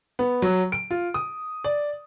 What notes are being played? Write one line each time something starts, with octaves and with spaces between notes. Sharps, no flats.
B3
F#3
D7
F4
D#6
D5